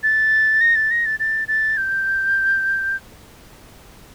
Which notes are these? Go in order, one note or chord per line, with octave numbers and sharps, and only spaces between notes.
A6
A#6
A6
A#6
A6
A6
A6
G6